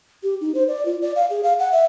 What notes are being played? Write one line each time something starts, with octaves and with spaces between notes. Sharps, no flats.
G4
D#4
C5
D5
F4
D5
F5
G#4
F5
F#5
E5